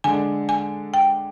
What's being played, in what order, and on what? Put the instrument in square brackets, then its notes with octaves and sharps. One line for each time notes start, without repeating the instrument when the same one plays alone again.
[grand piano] D3 G#3 D4 [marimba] G#5
[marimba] G#5
G5